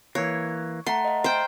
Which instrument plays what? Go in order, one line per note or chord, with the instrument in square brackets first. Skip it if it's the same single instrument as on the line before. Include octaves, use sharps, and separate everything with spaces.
[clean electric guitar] E3 A#3 [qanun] C#5 [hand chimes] F#6
[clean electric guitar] A3 [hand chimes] F#5 A#5 [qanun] C6
[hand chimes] D#5 F5
[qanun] C5 G5 [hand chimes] A#5 F6